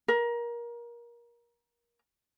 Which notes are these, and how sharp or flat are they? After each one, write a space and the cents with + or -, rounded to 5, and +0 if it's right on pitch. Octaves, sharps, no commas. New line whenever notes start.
A#4 +25